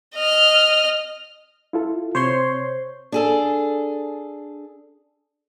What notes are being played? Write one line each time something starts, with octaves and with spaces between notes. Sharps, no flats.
D#5 F6
E4 F4 A4
C3 C5 C#5 C6
D4 G#4 A4